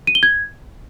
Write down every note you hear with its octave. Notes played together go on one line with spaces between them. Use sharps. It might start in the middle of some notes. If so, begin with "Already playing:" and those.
D#7
G7
G#6